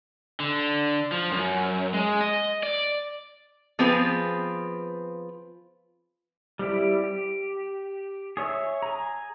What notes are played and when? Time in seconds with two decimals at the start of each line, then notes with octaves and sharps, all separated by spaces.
0.40 D3
1.12 F3
1.31 F#2
1.93 G#3
2.21 D#5
2.63 D5
3.79 F3 B3 C4 F4 G#4 B4
6.59 G3 C4 E4 G4
7.04 G4
8.37 G#4 C#5 E5 C#6
8.82 G#4 A#5